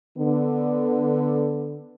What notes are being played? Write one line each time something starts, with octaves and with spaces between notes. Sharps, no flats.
D3 B3